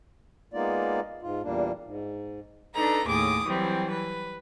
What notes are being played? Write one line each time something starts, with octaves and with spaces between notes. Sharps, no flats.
G#3 A#3 B3 D#4 F4 D5
G#2 F4
E2 A#2 G3 A#3 D4
G#2
D4 D#4 A4 B4 A#5
D#2 A2 G#4 D6 D#6
E3 F#3 G3 C4
B4